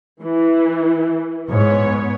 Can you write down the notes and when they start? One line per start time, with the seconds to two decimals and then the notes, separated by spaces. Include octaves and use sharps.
0.23 E3
1.49 G#2 B3 C#5